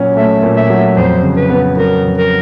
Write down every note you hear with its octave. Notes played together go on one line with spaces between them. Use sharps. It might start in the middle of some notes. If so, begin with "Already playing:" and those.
Already playing: A#2 F#3 C#4
A3 E5
A#2
E5
F#3
F2 C5
C#3
B4
B3
F#3 A#4
F2
A#4